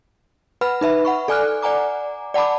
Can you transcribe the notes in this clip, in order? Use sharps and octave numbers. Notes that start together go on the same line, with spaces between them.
B4 F#5 B5 F6
D#4 B4 E5 B5
F#5 B5 C#6
A4 D5 G#5 D6 F6 F#6
D5 F#5 G#5 A#5 D6
D5 F#5 A5 B5 D6